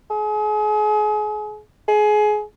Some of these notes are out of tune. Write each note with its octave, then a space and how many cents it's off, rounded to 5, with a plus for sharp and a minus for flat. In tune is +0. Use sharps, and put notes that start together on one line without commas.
G#4 +35
G#4 +20